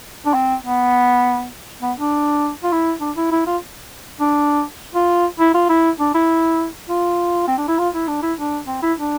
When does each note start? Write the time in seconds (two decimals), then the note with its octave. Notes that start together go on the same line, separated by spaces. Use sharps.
0.26 D4
0.34 C4
0.63 B3
1.82 B3
1.98 D4
2.63 F4
2.72 E4
3.01 D4
3.17 E4
3.31 E4
3.46 F4
4.20 D4
4.94 F4
5.40 E4
5.54 F4
5.69 E4
5.99 D4
6.14 E4
6.89 F4
7.48 C4
7.58 D4
7.68 E4
7.78 F4
7.94 E4
8.07 D4
8.22 E4
8.38 D4
8.67 C4
8.82 E4
8.98 D4